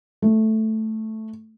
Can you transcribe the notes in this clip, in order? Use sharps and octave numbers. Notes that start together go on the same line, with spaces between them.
A3